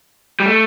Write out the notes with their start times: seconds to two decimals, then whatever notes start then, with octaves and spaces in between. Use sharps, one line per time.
0.40 G3
0.46 A3